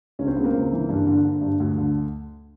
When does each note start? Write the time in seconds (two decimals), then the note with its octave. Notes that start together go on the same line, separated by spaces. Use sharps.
0.19 C#2 C#4
0.27 C4
0.36 C#3 B3
0.44 A#3 C4
0.54 C#2
0.72 E3
0.89 G2
1.07 D3
1.24 D3
1.41 G2
1.60 D2
1.78 D3